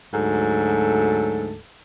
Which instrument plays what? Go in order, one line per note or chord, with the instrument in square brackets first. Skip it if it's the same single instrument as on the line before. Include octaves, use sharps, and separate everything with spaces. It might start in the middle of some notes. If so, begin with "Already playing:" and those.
[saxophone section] D2 G#2 F#3 A4